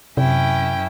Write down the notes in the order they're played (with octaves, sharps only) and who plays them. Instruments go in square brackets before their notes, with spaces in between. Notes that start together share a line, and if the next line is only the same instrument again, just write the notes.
[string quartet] F#2 C#4 E4 [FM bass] C3 [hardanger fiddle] G5